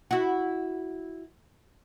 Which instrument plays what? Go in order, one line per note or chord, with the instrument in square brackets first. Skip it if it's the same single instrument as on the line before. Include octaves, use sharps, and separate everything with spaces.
[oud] E4 F#4